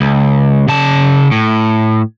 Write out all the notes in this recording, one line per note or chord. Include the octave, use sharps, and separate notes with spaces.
C#2
C#3 A5
A2